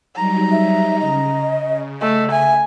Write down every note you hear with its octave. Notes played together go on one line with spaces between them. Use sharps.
F#3 G3 D#4 A#5
E5
C#3 D#5
A3 D#5
E5 G#5